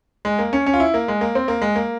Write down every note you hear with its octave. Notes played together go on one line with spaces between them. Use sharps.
G#3
A#3
C#4
C#4
F4
E4
A#3
G#3
A#3
C4
A#3
G#3
A#3